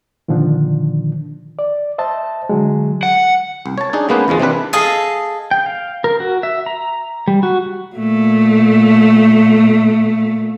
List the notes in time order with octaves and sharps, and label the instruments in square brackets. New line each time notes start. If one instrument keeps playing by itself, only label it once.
[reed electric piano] A#2 D3 D#3 F3 D4
D5
C5 D#5 E5 A5
D3 F#3 G#3
[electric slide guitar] F#5
[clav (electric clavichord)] C2
C#5 A5
D4 D#4 G#4
C#3 G#3 A#3 B3 D#4 B4
E2 G#2 F3 G#3
C3 E3 C4 D4 B4
[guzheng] G#4 A4 D#5 F5
[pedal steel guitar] G5
F5
A#4
F#4
E5
A#5
G3
F#4
[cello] A#2 A3